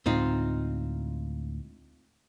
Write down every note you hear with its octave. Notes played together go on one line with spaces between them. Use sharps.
D2 A2 G#3 C4 D#4 F4